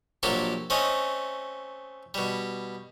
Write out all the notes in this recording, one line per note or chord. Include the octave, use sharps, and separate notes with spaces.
A#1 F#3 A#3 G4 A4
A3 C4 C#4 D#5
B2 G3